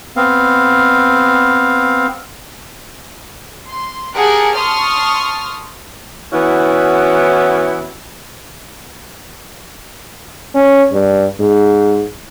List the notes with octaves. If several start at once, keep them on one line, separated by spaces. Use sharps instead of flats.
B3 C4 F5
C6
G4 G#4 A#4 F#5 G#5 A5
A5 C6 C#6 D#6 F6
E3 B3 C#4 E4 F#4
C#4
G2
G#2